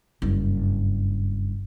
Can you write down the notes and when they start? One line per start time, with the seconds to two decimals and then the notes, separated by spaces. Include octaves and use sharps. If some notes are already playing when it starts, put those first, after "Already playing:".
0.22 F#1 G2